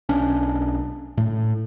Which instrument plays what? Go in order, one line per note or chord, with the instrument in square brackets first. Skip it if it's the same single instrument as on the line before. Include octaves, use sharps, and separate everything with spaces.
[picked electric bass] B1 C#4 D4
A2